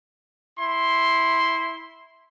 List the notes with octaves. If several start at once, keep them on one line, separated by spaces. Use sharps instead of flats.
E4 C6